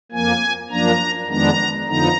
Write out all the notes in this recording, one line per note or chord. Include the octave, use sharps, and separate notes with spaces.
F2 F3 A#3 G#5
F#2 F3 A#3 D4 A#5
F2 D#3 G#3 B3 D4 A#5
F2 D3 F3 B3 D#4 A#5